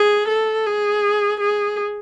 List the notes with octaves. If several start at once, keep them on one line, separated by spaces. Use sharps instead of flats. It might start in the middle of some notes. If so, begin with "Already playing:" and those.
Already playing: G#4
A4
G#4
G#4